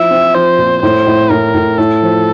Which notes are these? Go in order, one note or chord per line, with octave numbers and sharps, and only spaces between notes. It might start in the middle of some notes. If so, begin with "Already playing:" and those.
Already playing: F3 E4 E5
C4
F3 C5
A#2
A2 C5
A2
A2 A#4
A2
A2 A4
F3